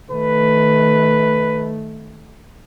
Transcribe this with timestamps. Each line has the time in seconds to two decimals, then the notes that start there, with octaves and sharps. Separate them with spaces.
0.11 D#3 A3 B4